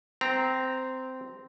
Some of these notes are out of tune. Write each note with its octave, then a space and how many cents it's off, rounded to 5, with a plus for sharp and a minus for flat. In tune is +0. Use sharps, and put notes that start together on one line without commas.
C4 -10 A#5 +0